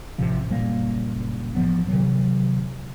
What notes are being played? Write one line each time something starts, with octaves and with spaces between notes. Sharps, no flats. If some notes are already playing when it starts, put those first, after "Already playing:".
A1 C3 F3
F#1 A#2 G3 A#3
A1 D#3 F3 B3
C3 D#3 F#3